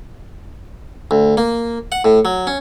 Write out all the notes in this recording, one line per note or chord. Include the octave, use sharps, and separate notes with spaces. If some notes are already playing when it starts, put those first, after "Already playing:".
D2
A#3
F#5
A2
F#3
C#4